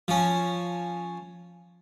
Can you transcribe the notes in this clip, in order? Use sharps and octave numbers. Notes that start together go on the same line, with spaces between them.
F3 C#4